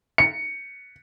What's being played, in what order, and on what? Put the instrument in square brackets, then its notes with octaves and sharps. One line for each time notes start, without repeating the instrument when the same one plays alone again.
[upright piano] C#7